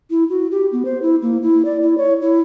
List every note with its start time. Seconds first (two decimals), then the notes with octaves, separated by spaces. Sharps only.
0.10 E4
0.30 F#4
0.51 G4
0.72 B3
0.85 C5
1.02 E4
1.22 A#3
1.42 E4
1.65 D5
1.82 E4
1.98 C#5
2.21 E4